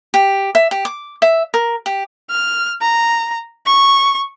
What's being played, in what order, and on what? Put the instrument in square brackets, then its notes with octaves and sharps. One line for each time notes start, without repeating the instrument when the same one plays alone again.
[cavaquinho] G4
E5
G4
D6
E5
A#4
G4
[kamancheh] F6
A#5
C#6